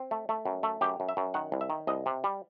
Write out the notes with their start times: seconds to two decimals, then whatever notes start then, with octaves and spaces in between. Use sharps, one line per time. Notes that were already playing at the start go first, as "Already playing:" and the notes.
Already playing: C4
0.11 A3
0.29 A3
0.45 F#2
0.63 A3
0.81 F#2 G4
1.00 F#2
1.09 E5
1.17 F#2
1.34 D#3 F#5
1.52 C2
1.61 E5
1.70 D#3
1.87 C2 D#5
2.06 C3
2.24 G3